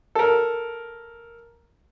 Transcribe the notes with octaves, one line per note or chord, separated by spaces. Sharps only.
A4 A#4